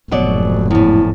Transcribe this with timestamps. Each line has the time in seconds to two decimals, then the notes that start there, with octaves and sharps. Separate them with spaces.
0.11 F1 G#2 B2 F#3 D5
0.71 E2 A2 E4